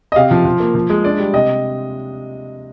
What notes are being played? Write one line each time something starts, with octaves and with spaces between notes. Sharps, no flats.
D#5
C3 F5
F3
F3
A#3
F3
G#3
D4 D5
G3
C3 D#5